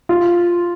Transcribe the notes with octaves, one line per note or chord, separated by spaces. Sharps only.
F4